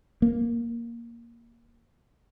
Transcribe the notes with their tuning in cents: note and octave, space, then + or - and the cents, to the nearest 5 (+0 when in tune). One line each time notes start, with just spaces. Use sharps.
A#3 +5